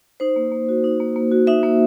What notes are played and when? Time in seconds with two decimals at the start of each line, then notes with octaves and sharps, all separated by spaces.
0.20 D#4 C5
0.36 A#3
0.52 A#3
0.69 F#4
0.84 D#4
1.00 A#3
1.16 A#3
1.32 F#4
1.47 D#4 E5
1.63 A#3